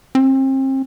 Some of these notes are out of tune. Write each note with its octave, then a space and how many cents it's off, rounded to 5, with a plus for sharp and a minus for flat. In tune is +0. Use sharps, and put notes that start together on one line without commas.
C4 +35